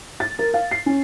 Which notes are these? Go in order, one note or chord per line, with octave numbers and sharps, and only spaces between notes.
A6
A#4
F5
C7
C#4